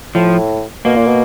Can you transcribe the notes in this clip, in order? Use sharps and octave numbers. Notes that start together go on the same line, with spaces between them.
A2 F3
B2 A#3
A#2
B2